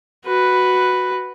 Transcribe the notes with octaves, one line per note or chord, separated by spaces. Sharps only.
F#4 B4